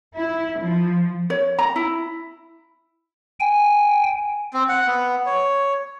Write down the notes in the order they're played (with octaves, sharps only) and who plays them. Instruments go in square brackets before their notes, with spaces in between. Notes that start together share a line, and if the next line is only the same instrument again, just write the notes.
[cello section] E4
F3
[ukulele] C#5
A#5
E4
[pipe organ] G5 G#5
[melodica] C4
F#5
B3
C#5